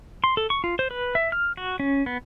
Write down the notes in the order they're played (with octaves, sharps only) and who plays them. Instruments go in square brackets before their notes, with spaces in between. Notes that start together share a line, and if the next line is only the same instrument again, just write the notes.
[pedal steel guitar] C6
A4
C#6
F4
C5
B4
E5
F6
F#4
C#4
B3